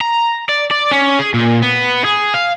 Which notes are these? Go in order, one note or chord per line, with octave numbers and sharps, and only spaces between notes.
A#5
D5
D5
C#4
G#4
A#2
B3
G#4
F5